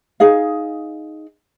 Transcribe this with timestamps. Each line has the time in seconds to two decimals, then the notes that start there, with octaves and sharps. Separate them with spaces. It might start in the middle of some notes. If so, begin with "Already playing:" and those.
0.20 D#4 G#4 F5